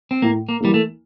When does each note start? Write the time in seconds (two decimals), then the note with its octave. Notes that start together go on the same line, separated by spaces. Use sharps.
0.11 C4
0.22 A2 A#3
0.49 A#3
0.61 E3 G3 A#3
0.74 A3